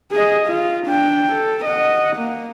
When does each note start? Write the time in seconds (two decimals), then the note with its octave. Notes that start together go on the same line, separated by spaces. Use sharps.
0.12 G#4 D#5
0.47 F4
0.87 D4 G5
1.32 A4
1.65 D#5 F#5
2.17 A#3